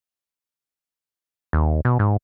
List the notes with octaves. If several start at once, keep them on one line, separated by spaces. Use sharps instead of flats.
D#2
B2
G#2